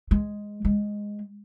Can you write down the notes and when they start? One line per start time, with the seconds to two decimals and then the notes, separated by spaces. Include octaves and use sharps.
0.11 G#3
0.65 G#3